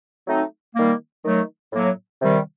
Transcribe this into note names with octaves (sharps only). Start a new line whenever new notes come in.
F#3 A3 C4 D#4
D#3 G3 A#3
D#3 F#3 A3
A2 F#3 A#3
C3 D#3 G3